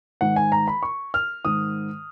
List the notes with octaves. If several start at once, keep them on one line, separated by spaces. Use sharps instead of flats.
G#2 D#3 F#5
G#5
A#5
B5
C#6
F6
G#2 D#3 D#6